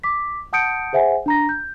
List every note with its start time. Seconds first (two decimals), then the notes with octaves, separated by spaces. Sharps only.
0.04 D6 B6
0.53 F#5 A5 D#6 G6 C#7 D7
0.93 G#4 C5 E5 F#5 G#5
1.26 D4 A#5 A#6
1.49 G6